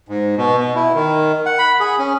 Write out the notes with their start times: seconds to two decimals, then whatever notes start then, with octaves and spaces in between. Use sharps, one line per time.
0.09 G#2
0.37 B2
0.58 B2
0.75 E4
0.94 D#3
1.46 F#5
1.59 B5
1.80 G#4
1.99 C#4